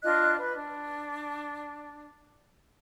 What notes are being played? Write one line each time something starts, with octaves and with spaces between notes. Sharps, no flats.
D4 F4 D#5 F#6
B4
D4